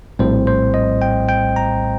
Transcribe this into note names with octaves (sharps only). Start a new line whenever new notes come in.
A#1 A2 G3 C4 C5
C5
D#5
G5
G5
A#5